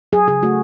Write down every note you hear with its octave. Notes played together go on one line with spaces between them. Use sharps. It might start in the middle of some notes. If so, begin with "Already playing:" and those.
F#3 G#4
C#3 G#4
A3 F#4